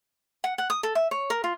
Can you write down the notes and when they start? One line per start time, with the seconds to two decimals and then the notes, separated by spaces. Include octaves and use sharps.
0.44 F#5
0.58 F#5
0.70 D#6
0.83 A4
0.95 E5
1.11 C#5
1.30 A#4
1.44 F4